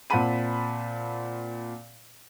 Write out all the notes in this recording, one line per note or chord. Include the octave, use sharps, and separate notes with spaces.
A#2 C4 F#5 A5 B5 D#7